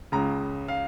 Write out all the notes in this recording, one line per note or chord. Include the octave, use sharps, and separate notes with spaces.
C#2 C#3 A#5
F5